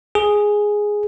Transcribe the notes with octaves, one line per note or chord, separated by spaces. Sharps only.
G#4